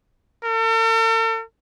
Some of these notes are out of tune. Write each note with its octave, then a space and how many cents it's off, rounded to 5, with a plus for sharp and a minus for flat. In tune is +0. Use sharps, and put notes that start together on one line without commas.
A4 +45